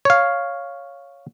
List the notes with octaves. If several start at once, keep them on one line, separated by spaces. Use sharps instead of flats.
C#5 F5